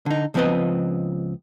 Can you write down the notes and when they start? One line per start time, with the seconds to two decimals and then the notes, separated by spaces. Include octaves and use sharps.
0.06 D3 D#4
0.34 C#2 F3 B3 C4 B4 D#5